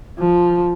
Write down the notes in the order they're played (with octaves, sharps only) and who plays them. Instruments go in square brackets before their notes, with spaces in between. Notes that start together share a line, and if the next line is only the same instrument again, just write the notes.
[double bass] F3